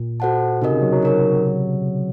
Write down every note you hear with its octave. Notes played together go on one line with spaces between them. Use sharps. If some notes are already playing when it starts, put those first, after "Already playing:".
Already playing: A#2
F#4 A4 C5 F#5 A5
C3 D#4 F#4 A#4 D#5
C#3
F#3
F#3
D#4 A#4 C#5